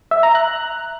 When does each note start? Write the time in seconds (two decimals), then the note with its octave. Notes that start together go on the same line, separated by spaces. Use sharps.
0.11 E5
0.23 A#5
0.35 F#6